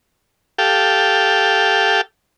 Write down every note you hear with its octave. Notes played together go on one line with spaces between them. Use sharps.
G4 A4 F5 G5